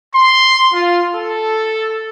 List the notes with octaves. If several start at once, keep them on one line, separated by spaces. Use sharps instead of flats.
C6
F4
A4